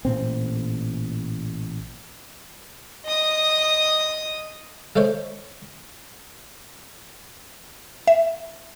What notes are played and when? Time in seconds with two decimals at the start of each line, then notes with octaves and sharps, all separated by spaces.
0.05 A1 A#2 C4
3.06 D#5 D#6
4.96 G#3 A3 C5 C#5
8.07 E5